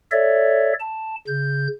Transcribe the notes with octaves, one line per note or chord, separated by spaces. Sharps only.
A4 C#5 D5 E5
A5
C#3 G6